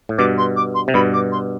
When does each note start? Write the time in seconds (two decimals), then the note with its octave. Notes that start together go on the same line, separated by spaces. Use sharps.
0.09 A2
0.18 G2 B2 D6
0.38 C6
0.56 D6
0.75 C6
0.88 C3
0.94 G2 B2 B5
1.13 D6
1.32 C6